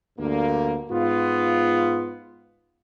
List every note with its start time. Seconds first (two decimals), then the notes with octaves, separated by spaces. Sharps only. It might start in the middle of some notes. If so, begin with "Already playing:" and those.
0.19 D2 G2 D3 A#3
0.91 G#2 B3 F4